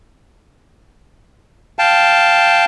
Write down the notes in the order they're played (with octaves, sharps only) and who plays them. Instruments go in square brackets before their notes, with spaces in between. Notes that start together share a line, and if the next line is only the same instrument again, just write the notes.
[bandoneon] F5 G5 A5